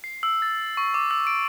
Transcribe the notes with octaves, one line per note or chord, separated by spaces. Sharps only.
C7
E6
A6
C#6
D6
E6
D7